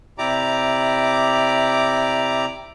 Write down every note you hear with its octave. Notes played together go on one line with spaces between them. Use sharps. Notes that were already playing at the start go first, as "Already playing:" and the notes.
C3 E4 G4 D5 A#5 D6